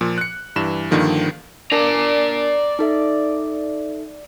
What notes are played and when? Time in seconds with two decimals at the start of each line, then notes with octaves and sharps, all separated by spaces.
0.01 A#2 F3
0.18 F#6 C#7
0.56 G2 E3 E7
0.91 G2 D3 D#3 F3 A#3
1.72 D4 A#4 D5 A5 A#5
2.79 D#4 A4 E5